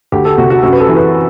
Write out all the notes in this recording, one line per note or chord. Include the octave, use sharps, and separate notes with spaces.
D2 G4
A4
C3 F#4
F#4
F#2 F#4
B4
A4
E3
B4